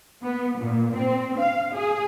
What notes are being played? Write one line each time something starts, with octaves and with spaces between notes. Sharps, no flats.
B3
A#2
C4
F5
G#4